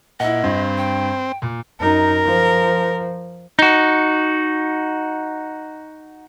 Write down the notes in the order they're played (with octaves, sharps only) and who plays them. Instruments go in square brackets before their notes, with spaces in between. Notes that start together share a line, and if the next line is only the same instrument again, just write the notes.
[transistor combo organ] A#2 [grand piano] E4 F#5 [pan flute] D#5
[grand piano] G2 [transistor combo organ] C4
[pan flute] G5
[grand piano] A#2
[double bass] F#2 D#4 [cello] A#4
[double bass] F3
[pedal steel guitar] D#4 F#4